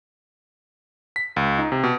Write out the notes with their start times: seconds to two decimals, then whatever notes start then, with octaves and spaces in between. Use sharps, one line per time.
1.16 B6
1.36 C#2
1.59 D#4
1.72 C3
1.84 B2